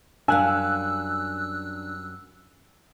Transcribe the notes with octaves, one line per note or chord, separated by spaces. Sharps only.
F#2 G3 D4 F5 G#5 E6 F#6